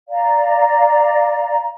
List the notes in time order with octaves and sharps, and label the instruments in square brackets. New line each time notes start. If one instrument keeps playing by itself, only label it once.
[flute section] D5 F5 A#5